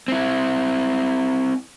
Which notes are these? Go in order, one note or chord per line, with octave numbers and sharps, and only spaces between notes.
C4 E4